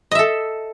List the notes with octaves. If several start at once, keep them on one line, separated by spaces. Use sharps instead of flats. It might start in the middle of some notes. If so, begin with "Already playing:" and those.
A4 D#5 E5